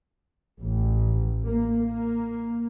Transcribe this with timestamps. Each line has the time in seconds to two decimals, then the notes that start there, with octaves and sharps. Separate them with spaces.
0.59 A1
1.43 A#3
1.79 A#3